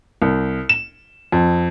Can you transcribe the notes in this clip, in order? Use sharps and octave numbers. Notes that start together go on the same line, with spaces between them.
C2
E7
F2